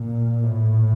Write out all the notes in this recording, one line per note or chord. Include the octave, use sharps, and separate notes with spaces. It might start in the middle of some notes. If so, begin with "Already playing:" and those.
Already playing: A#2
A2